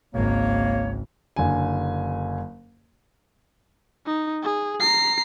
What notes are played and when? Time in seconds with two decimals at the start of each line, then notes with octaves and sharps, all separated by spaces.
0.15 G#1 C#2 A#3 C#5
1.36 F#1 D3 G#5
4.06 D#4
4.43 G#4
4.80 A#5 C7